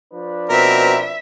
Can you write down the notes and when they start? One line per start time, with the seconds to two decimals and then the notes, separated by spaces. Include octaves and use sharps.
0.12 F3 D4 B4
0.50 B2 C4 A#4 E5